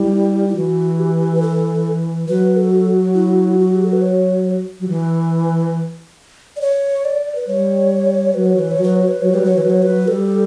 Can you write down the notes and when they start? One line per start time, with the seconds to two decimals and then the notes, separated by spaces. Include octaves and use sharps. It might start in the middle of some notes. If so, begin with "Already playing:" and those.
Already playing: G3 E4
0.49 E4
0.55 E3 F#4
0.99 G4
1.34 B4
1.42 A4
2.28 F#3 B4
2.57 A4
3.15 E4
3.59 F#4
3.75 G4
3.84 A4
3.92 B4
4.02 C#5
4.80 F#3
4.88 E3
6.56 D5
6.61 C#5
7.05 D5
7.35 B4
7.47 G3 C#5
8.34 F#3 B4
8.46 C#5
8.56 E3 B4
8.71 C#5
8.78 F#3
8.84 B4
8.96 C#5
9.08 B4
9.21 F#3 C#5
9.32 G3 B4
9.42 F#3 C#5
9.56 E3 B4
9.64 F#3
9.70 C#5
9.82 F#3 B4
10.08 G3 A4